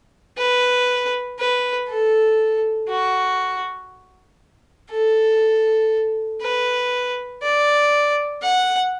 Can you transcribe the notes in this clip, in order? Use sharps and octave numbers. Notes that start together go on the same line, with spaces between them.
B4
B4
A4
F#4
A4
B4
D5
F#5